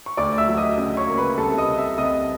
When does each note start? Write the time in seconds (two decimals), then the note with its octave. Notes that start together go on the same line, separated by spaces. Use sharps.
0.06 C#6
0.17 D2 D5 D6
0.38 E5 E6
0.48 F#3
0.57 D#5 D#6
0.78 C#3 D#5 D#6
0.97 C#5 C#6
1.07 A#3
1.18 B4 B5
1.38 C2 A4 A5
1.58 D#5 D#6
1.68 C3
1.77 E5 E6
1.98 C2 D#5 D#6